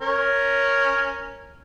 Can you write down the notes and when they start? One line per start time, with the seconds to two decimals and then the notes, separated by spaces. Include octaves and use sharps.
0.02 C#4 A#4